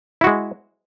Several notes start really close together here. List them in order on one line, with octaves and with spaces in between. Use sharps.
E4 F#4 G#3